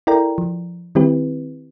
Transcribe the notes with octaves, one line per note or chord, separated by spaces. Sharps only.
E4 A4 A#4 D5 G5 A#5
F3
D#3 G3 C4 E4 G4 B4